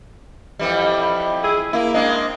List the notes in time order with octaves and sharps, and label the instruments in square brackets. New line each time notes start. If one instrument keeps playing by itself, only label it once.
[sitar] F2 E3 G3
[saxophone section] E4 G#4
[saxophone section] A#3 [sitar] E4
[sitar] G#3 C4 D4